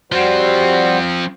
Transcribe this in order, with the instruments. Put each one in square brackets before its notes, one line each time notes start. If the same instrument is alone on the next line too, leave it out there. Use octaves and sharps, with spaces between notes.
[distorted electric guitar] F3 C4 [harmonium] G3 F#4 C5